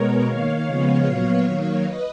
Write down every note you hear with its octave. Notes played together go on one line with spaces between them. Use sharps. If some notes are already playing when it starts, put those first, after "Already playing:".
Already playing: B2 G#3 B3 A#4 C#5
D#3 A#3 C#5 F5
C#3 F3 G#3 B3
A#2 F#3 B3
D#3 F#3 A#3 C#5 F5
B4 D#5